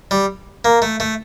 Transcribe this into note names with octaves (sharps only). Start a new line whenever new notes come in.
G3
A#3
A3
A3